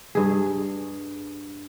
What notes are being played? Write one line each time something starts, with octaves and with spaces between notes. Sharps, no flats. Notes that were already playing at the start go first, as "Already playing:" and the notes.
G2 G#4